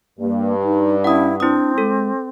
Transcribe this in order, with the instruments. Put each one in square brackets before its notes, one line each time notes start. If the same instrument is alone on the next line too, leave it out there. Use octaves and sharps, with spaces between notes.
[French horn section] G2 [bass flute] A#3
[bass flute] D#4
[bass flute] C#4 [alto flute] E4 [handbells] F#5 D#6
[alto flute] C4 [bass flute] D4 [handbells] E4 D#6
[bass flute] G#3 [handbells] A4